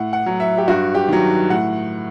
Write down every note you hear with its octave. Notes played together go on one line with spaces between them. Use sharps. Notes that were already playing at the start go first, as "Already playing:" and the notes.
Already playing: A2 F#5
F#5
F#3
E5
G4
G2 F#4
G4
D#3 F#3
A2 F#5